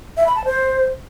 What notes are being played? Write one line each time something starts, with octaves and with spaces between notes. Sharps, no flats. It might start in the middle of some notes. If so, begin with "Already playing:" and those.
E5
B5
A5
C5